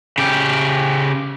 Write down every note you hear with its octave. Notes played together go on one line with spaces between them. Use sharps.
C#3 G4